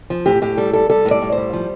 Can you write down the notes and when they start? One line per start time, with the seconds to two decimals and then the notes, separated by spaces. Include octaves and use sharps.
0.10 F3
0.26 A2 G4
0.42 A2 G4
0.57 G3 A4
0.73 G3 A4
0.90 G3 A4
1.05 A2
1.11 D5
1.22 A2
1.32 G3 C5
1.53 F3